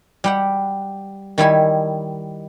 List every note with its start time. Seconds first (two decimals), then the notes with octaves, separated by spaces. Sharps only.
0.24 G3 G4 F#5
1.38 D#3 G3 E4 G#5